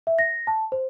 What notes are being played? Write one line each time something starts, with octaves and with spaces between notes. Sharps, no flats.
E5
A#6
A5
C5